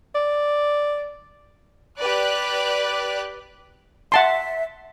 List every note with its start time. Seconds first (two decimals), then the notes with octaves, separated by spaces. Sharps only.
0.15 D5
1.99 G4 B4 D5 F#6
4.12 E5 F#5 A5 C6